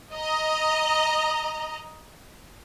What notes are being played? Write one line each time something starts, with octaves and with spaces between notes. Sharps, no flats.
D#5 A#5